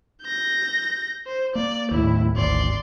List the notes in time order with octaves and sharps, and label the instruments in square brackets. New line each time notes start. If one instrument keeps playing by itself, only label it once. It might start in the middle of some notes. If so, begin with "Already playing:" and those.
[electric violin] G6 A#6
C5
[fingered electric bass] A#3 [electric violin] D5
[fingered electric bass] D#2 A2 [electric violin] E4
[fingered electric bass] G#1 D2 [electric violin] D5 C6